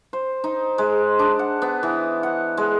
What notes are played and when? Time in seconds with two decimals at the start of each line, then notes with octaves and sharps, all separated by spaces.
0.13 C5
0.44 D#4
0.78 G#3
1.19 D4
1.39 F#5
1.62 B3
1.83 E3
2.23 F#5
2.57 G#3